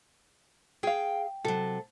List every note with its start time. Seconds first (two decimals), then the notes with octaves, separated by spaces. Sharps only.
0.83 G#4 F5 G5
1.45 C3 F#3 A4